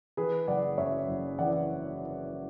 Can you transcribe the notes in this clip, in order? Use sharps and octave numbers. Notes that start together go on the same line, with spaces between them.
E3 G#4 B4
F#1 D5 F#5
F#2 C#5 E5
F#1
E3 D5 F#5